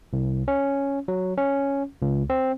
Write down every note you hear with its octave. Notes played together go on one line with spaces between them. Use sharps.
C2
C#4
F#3
C#4
C#2
C4